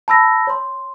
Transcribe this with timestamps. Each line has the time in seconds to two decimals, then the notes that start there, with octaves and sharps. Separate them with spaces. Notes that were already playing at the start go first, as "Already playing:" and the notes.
0.08 A5 B5 E6 A#6
0.47 C#5 C6